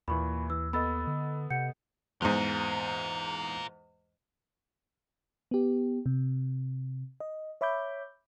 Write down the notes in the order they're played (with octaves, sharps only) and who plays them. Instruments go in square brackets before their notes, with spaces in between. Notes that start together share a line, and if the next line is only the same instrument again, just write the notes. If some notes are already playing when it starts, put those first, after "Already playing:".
[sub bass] D#2 [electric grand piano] A#2 E3 [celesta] B5 C#6
[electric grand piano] E3 [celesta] E6
[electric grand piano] B3 A4 D#5 [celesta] B5 E6 A6
[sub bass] D3
[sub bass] C3 [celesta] F#5 G6 C#7
[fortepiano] E2 G#2 [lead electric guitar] F4 A#4
[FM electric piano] B3 G4
C3
D#5
C#5 E5 B5 D6 G6